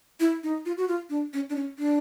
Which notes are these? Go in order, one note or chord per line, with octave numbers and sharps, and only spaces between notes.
E4
D#4
F4
F#4
F4
D4
C#4
D4
C#4
D4